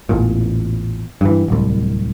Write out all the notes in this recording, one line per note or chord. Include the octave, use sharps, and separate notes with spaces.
A1 E2 A#2
G2 E3
D1 C2